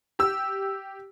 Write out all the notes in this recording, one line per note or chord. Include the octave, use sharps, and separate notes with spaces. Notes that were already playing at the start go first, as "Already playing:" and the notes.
G4 E6